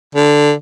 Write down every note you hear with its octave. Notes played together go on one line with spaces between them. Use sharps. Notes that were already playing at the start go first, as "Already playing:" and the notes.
D3